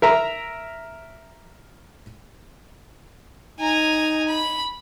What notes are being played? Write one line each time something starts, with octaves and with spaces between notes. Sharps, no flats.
A#4 E5 A#5
D#4 G#5 A#5
B5